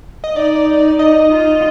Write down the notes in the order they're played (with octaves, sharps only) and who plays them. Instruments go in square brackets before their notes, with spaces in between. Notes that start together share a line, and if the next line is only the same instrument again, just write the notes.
[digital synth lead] D#5
[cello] D#4 [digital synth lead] D5
[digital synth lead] D#5
[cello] F4